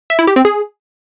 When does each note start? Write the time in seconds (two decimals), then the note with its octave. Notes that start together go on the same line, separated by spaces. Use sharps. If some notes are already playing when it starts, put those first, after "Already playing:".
0.10 E5
0.19 E4
0.27 G4
0.36 C4
0.45 G#4